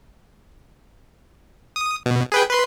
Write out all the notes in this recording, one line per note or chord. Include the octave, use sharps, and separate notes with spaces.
D#6
B2
G#4 B4 G5
B4 C6